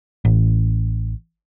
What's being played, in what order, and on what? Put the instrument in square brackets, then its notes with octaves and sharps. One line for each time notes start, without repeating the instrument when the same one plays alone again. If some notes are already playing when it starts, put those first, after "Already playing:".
[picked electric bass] A1